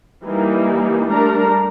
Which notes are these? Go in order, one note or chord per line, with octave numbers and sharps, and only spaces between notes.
E3 G3 A#3 D#4
G3 A3 D4 A#4 A#5